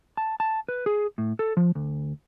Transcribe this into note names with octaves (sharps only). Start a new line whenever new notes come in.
A5
A5
B4
G#4
A2
A4
F3
D2